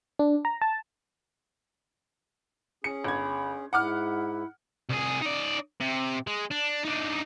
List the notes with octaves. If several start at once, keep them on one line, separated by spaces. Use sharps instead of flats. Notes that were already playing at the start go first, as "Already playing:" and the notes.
D4
A#5
A5
C#4 G#4 C#7
G1 B5 G#6
G#2 E4 F#5 D6 F6
C2 G#4
D#4 D5
C3
G#3
D4
D4 D#4